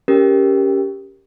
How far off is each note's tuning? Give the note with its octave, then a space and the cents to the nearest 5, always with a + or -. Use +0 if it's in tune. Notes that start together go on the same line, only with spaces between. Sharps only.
C#4 +10 G4 +0 A#4 +0